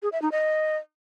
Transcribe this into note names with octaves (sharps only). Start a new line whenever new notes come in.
G#4
E5
D#4
D#5